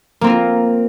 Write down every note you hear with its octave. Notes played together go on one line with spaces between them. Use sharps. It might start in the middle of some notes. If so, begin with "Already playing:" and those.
A#3 C4 F4 A#4